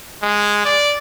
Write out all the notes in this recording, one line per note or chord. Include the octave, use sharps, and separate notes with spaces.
G#3
D5